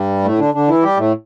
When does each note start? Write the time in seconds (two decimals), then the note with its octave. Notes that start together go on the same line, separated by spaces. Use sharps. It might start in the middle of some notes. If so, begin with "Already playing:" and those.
Already playing: G2 G3
0.24 A2 A3
0.39 D3 D4
0.54 D3 D4
0.68 E3 E4
0.83 G3 G4
0.97 A2 A3